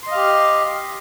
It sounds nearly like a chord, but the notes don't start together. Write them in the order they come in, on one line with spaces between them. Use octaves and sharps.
C6 D#5 F5 G4